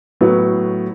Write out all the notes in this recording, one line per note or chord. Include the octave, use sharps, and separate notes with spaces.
A2 F#3 B3